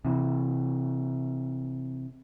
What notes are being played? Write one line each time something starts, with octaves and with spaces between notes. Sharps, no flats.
C3 E3